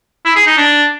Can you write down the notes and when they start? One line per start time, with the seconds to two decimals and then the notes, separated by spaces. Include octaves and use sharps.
0.25 E4
0.36 G#4
0.46 D#4
0.57 D4